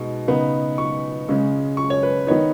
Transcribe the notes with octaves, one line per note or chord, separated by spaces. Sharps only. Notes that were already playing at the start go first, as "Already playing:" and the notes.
Already playing: B2 G#3 D#4
C#3 B3 D#4
C#6
C#3 G#3 C#4
C#6
C#5
B4
D#3 B3 D#4 C#5